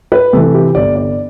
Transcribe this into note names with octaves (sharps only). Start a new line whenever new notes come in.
B4
C3 E3 A4
G4
G1 D5
D5